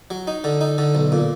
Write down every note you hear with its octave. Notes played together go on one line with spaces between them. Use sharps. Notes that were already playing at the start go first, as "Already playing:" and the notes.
F#3
D#4
D3
D#4
D3
B1
A#2